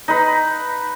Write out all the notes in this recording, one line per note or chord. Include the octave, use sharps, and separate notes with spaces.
D#4 B4